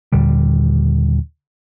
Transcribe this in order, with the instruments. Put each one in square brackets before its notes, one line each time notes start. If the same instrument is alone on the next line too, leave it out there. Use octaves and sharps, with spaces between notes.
[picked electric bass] D#2 A#2 D3 G3